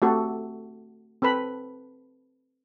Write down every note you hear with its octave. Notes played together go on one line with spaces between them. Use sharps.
A3 C4 F#4 G4 A4
C4 A4 B4 B5